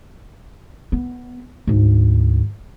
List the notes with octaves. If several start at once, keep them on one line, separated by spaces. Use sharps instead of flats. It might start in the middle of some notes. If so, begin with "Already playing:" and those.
B3
D2 G#2